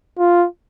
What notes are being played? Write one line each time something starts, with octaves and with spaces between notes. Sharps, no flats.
F4